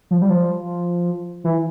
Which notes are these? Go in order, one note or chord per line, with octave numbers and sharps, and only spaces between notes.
F3
G3
F3
E3